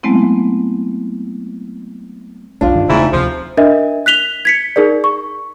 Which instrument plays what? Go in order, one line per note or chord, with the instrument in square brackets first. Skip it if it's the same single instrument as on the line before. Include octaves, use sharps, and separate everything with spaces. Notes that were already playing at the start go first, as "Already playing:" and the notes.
[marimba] F#3 G#3 A3 B3 C4 E4
[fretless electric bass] E1 B1 B2 [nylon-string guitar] D4 F4
[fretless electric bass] G2 D#3
[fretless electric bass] E1 C#3 A3 [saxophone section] G#2 C4 E4
[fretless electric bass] D2 C3 [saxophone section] F3
[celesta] D4 A#4 D#5 E5
F#6 B6 F7 G7
G#6 B6 C#7
D#4 G#4 A#4 D5
C#6